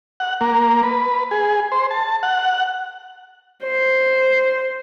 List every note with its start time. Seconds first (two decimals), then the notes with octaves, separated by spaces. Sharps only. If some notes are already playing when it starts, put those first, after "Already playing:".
0.20 F#5
0.41 A#3
0.83 B4
1.31 G#4
1.72 C5
1.91 A5
2.23 F#5
3.64 C5